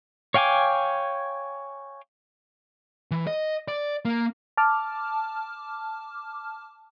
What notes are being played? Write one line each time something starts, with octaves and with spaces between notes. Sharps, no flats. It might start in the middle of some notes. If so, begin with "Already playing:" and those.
C#5 F5 G5 G#5 D6
E3
D#5
D5
A#3
A5 D6 F6